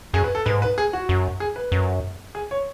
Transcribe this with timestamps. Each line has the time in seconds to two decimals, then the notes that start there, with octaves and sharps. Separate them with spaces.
0.14 F#2 G#4
0.24 B4
0.35 A4
0.46 G#2 B4
0.62 B4
0.78 G#4
0.93 F#4
1.09 F#2
1.40 G#4
1.56 B4
1.72 F#2
2.35 G#4
2.51 C#5